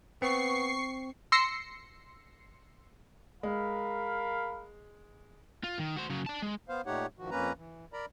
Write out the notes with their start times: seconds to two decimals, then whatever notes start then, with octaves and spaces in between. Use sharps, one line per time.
0.22 B3 C4 C#6 C7
1.32 C6 E6 A#6 C7 C#7
3.43 G#3 A#4 F5 B5
5.64 F4
5.79 D#3
5.96 F#4 C5
6.10 C#3 F#3
6.26 D5 A5
6.42 G#3
6.69 B3 C5 F5
6.86 A#2 A3 D#4 G4 C#5 F#5
7.19 G2 D#3 F3 F#4
7.31 F2 A#3 C#4 B4 A#5
7.57 E3
7.93 A#4 D5 A#5 B5